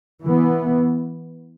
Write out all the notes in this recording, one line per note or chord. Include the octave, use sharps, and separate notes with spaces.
E3 B3